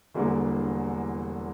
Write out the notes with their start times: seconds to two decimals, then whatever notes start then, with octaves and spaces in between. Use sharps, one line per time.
0.14 E1 E2 D3 G3 A#3